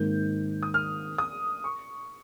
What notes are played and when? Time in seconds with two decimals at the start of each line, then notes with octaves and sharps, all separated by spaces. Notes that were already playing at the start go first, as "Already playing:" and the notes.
Already playing: G#1 G#2 D#3 A#3 G6
0.63 D#6
0.74 F6
1.18 D#6
1.64 C#6